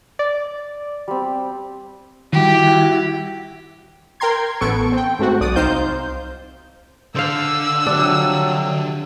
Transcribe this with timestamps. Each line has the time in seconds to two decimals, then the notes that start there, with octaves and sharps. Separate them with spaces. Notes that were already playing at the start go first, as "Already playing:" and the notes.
0.19 D5
1.08 G3 C4
2.33 D#3 G3 E4 F#4 G4
4.20 A#4 G5 A#5 C6 G#6
4.61 A1 B3 A4 C#6 D7
4.92 C4 G5
5.19 G#2 A3 C4 F#4
5.40 B1 D5 D#6
5.56 C2 C4 D#4 C5 F5 G6
7.16 D3 C5 F5 E6
7.86 C3 F3 F#3 D4